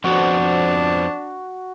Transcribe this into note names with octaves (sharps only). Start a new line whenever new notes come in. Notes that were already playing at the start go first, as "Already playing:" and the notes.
F2 F3 B3 D4 F#4